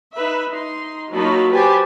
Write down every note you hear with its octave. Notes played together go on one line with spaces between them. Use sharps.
D#4 B4 E5
D#4 C6
F#3 A#3 D#4 F4 A5 B5
G4 B4 C5 G#5 A5